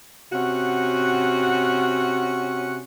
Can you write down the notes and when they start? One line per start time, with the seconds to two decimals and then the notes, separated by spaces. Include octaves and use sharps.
0.32 C3 C#4 F#4 F#5